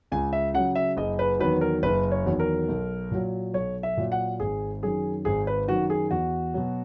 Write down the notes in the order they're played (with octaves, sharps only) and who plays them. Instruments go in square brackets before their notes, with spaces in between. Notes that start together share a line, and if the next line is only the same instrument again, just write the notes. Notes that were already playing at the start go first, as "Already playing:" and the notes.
[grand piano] C#2 G#5
E5
C#3 F#3 F#5
E5
F#1 D#5
B4
E2 D#3 F#3 B4
A#4
F#1 B4
C#5
E2 D#3 F#3
A#4
B1
A#2 F#3
B1 C#5
E5
A#2 F#3
F#5
G#1 G#4
F#2 D#3 G#4
G#1 G#4
B4
F#2 D#3 F#4
G#4
E2 F#4
B2 F#3